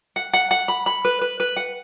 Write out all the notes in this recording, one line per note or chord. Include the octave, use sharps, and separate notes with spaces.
F#5
F#5
F#5
B5
B5
B4
B4
B4
F#5